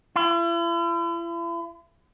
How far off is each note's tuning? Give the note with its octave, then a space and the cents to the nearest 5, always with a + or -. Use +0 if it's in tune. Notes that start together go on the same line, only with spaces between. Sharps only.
E4 +45